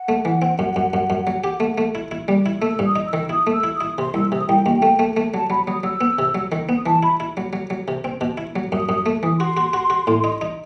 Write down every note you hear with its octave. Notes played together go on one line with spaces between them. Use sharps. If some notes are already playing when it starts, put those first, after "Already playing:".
Already playing: F#5
A3
E3
C4
F#2
F#2
F#2
F#2
F#3
G4
A3
A3
E4
E4
G3
E4
A3 E6
G2
D#6
D#4
E6
D#3
E4 D#6
A3
E6
E4
E4 D#6
C3 C6
C2 E6
C3 D#6
C2 G5
D#2
A3
A3
A3
F#3 A5
F#3 B5
F#3 D#6
F#3 E6
B3
C3
F#3
D#3
B3 D#6
E3 A5
E4 B5
E4
F#3
F#3
F#3
C3
C4
B2
E4
F#3
F#2 D#6
F#2 D#6
A3
E3 D#6
F#4 C6
F#4
F#4
F#4
A2
D#4
D#4